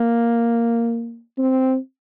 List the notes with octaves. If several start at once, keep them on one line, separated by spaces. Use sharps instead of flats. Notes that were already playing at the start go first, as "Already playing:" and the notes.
Already playing: A#3
C4